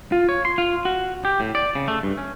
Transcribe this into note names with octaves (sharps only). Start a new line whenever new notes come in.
F4
C#5
C6
F4
F#4
G4
A2
D5
C#3
A3
G2
C#4